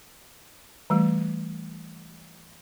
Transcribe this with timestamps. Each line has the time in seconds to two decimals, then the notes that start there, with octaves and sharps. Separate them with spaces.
0.90 E3 G3 A3